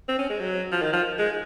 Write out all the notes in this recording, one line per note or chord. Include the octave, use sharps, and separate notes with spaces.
C4
C#4
G#3
F#3
F3
D#3
F3
G#3